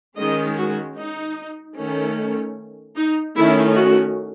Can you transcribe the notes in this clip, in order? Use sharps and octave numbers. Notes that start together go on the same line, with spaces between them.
D#3 G#3 C#4 D#5
F#4
D#4
D#3 A3 C#4
D#4
D#3 A3 C#4 E4
F#4